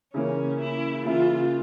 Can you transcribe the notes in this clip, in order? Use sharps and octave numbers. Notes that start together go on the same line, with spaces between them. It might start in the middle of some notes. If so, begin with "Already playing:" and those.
C#3 E3 A#3 C#4
E4
C#3 E3 A#3 E4 F4